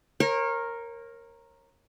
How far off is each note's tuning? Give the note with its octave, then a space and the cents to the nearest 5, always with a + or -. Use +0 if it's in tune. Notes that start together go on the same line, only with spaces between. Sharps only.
A#4 +0 C#5 -35